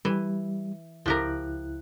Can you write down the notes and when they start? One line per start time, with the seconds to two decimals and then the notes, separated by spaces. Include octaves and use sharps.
0.05 E3 G3
1.06 C#2 F3 E4 G4 A#4 F#6